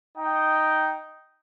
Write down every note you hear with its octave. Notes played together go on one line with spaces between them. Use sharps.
D#4 G5